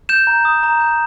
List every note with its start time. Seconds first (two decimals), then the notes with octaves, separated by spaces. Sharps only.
0.09 G6 E7
0.27 A#5
0.45 D#6
0.63 A#5
0.81 G6